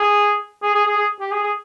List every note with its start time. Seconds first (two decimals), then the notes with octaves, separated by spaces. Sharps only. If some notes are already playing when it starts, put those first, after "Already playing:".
Already playing: G#4
0.62 G#4
0.74 G#4
0.86 G#4
0.96 G#4
1.20 G4
1.32 G#4
1.43 G#4